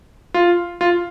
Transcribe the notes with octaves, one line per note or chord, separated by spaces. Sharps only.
F4
F4